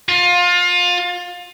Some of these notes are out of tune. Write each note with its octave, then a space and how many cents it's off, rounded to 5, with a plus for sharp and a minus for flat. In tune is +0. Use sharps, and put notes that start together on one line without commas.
F4 +25